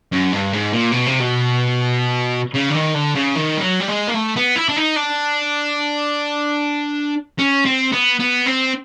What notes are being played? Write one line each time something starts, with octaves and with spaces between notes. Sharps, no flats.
F#2
G2
G#2
A#2
B2
C3
B2
C#3
D3
D#3
D3
C#3
D#3
G3
F#3
G3
G#3
A#3
A3
B3
E4
D4
D#4
D4
C#4
C4
B3
B3
C4